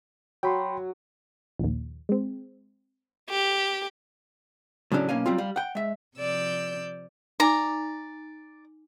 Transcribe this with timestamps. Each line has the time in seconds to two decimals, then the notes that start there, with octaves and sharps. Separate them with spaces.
0.43 F#3 G5 B5 C6
1.59 A#1 D#2
2.09 G#3 C4
3.30 G4
4.92 A2 C#3 F#3 C#4 D4
5.09 B1 A#3 C#4 F5 G#5
5.26 F#3 G3 C4 F4
5.38 G3 F5
5.56 F#5 G5
5.75 G#3 E5
6.16 C3 F3 D5 E6 G6
7.40 D#4 D5 G#5 A#5 D6